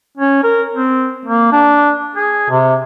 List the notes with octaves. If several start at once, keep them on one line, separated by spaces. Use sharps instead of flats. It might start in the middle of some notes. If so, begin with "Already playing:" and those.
C#4
A#4
C4
A#3
D4
G#4
C3